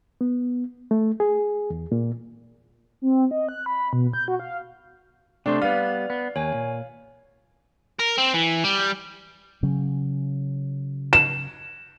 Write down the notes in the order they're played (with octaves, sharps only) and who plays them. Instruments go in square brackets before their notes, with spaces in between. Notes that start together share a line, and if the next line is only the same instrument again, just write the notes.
[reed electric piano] B3
A3
G#4
E2
A#2
[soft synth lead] C4
D#5
F#6
B5
B2
G6
F#4
F5
[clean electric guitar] C3 A3 C5 [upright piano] D4
[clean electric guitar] G3 B3 [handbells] B4 D5 [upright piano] F5
[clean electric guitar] B3
[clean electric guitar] D#2 [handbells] C#5 G#5
[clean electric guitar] A#2
[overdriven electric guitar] A#4
C4
E3
G3
[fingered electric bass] C#3 F#3 C#4
[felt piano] E7